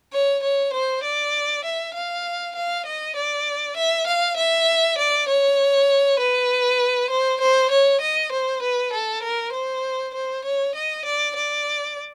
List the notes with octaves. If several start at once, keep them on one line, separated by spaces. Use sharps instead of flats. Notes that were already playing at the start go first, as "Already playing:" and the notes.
C#5
C#5
C5
D5
E5
F5
F5
D#5
D5
E5
F5
E5
D5
C#5
B4
C5
C5
C#5
D#5
C5
B4
A4
A#4
C5
C5
C#5
D#5
D5
D5